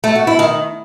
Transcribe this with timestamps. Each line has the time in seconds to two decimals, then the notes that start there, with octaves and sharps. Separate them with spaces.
0.04 A3
0.15 F#4
0.27 E4
0.39 D#3